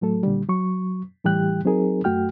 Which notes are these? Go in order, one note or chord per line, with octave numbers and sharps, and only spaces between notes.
A2 F#3 A3 A4
A#2 D3 G3
F#3 C#6
A2 E3 G3 G4 G5 F#6
F#3 C4 D#4 G#4 A#4
F#2 A3 F#4 G5 F6